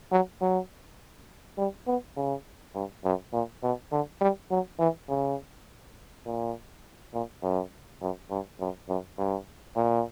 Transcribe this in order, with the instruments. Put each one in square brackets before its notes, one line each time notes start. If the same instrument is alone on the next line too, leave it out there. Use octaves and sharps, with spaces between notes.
[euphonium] F#3
F#3
G3
B3
C#3
G2
F#2
A#2
B2
D3
G3
F#3
E3
C#3
A#2
A#2
F#2
F#2
G2
F#2
F#2
G2
A#2